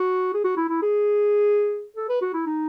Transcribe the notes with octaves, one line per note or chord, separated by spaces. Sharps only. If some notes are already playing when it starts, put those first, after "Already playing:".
Already playing: F#4
G#4
F#4
E4
E4
G#4
A4
B4
F#4
E4
D#4